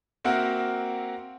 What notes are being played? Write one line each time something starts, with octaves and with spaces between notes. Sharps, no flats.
A#3 C4 F#4 A#4 E5 F#5